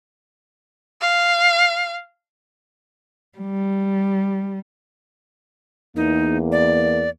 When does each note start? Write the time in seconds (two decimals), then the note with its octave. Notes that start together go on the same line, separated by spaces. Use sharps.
1.01 F5
3.38 G3
5.96 E2 A#3 D#4
6.52 D5